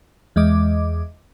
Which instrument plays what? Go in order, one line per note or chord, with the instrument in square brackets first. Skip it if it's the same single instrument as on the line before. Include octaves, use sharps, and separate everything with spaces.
[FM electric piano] E2 G#3 D#5 D6